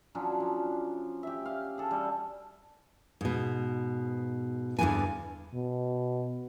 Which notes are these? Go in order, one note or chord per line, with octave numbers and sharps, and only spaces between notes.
F3 F#3 C#4 D4
F3
G4 E5
F5
G#4 A4
G3 A4
G#2 B2
E2 G2 B2 D3 E3 G#5
B2